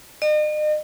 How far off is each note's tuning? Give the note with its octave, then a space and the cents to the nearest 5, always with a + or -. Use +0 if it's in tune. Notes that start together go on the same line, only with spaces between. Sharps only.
D#5 -40